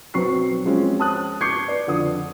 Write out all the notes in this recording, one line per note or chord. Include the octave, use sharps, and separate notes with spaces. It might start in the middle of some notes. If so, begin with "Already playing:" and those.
B1 F#3 C4 B4 C#6 C7
F3 G#3 C4 C#4
A5 D#6 F#6
C#6 D6 G6 G#6 C7 C#7
B4 D5
F2 D3 D#6